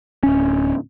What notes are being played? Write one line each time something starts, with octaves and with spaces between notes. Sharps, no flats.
D1 C#4